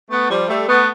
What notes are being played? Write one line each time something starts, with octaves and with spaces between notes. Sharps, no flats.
A3 B3
F3 G3
G3 A3
A3 B3